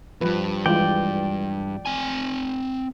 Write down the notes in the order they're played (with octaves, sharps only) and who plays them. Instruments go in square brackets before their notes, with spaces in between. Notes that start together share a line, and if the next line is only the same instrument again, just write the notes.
[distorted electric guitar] E2 G2 [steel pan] F3 B4
[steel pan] E3 G#3 F4 [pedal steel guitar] D5 G5
[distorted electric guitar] C4 G#5